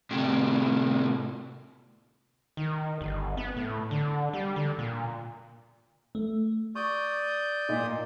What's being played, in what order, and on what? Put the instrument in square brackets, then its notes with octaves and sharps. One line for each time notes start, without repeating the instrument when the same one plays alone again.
[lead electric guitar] A2 C3
[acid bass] D#3
G1
B3
A2
D3
G3
D3
A#2
[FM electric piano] A3
[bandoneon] D5 D#6 G6 [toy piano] C#6
[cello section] A#2 [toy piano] D#4 D#5